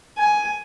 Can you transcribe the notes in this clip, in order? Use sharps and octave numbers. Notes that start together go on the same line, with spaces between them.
G#5